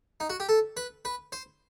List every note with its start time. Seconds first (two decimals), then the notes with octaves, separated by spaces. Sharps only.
0.20 D#4
0.30 F#4
0.40 G4
0.49 A4
0.77 B4
1.05 B4
1.32 C5